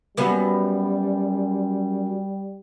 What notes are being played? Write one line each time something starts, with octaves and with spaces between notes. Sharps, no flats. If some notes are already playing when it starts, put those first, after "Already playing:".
F#2 G3 B3